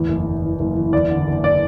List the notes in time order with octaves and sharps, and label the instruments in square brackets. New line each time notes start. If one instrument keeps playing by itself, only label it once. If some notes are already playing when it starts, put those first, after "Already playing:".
Already playing: [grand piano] E2 A2
F#1
F#1
E3
F#1
E3
E2 D5
D3
F#1
D5